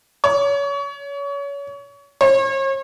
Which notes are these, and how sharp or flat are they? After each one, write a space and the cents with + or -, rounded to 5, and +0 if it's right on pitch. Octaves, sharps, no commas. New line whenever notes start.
C#5 +30
C#5 -40